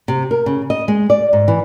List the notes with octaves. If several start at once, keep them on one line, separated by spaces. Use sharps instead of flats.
C3
A#4
C#3
D#5
G#3
D5
G#2
E3